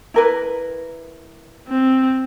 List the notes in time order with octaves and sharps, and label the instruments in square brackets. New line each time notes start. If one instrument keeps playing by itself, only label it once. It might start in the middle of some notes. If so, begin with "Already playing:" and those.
[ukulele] E4 A#4 B4
[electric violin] C4